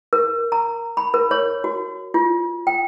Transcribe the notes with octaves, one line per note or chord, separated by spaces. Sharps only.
A#4
A#5
B5
A#4
C#5
F#4
F4
G5